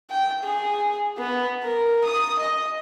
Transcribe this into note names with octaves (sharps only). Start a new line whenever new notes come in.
G5
G#4
B3
A#4
D#6
D#5